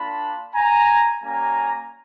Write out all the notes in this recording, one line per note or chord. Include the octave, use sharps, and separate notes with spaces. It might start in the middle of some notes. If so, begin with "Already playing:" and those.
Already playing: A#3 D4 F4 A5 B5
G#5 A#5
G3 A#3 C#4 G#5 A#5